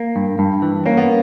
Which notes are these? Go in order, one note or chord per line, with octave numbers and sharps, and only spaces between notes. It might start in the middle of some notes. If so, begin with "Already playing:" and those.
Already playing: A#3
G2
G2
E3
A#3 C#4
B3